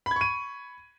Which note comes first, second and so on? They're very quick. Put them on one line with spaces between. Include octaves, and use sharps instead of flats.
B5 G#6 C#6 D#7